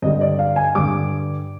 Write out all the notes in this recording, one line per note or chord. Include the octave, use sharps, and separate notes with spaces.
G2 D3 G3 D#5
D5
F5
G#5
G2 D3 G3 D6